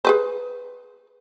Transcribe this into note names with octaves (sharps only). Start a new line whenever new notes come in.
G#4 B4 C5